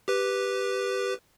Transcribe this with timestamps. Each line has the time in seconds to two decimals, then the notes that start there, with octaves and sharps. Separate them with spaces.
0.08 G4 B4